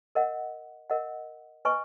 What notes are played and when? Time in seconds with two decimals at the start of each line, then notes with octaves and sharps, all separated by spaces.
0.15 A#4 D#5 F#5
0.90 A#4 D#5 F#5
1.65 B4 D#5 G#5 C#6